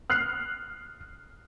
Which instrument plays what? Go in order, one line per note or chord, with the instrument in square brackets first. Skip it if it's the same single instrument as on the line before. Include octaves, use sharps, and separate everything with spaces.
[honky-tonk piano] F6 F#6 C7